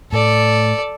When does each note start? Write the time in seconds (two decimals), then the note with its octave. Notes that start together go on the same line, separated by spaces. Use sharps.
0.12 A2 A4 D5